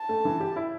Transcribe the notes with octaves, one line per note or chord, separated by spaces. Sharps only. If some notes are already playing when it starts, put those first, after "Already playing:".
Already playing: A5
A3
E3
G4
E4